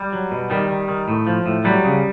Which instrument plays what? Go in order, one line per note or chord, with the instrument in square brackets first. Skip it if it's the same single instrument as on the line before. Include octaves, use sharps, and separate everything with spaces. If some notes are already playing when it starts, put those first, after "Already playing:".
Already playing: [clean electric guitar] G3
F#3
B2
D#3 G3
D#3
D#3
A2
F3
A2
F#3 G3
C#3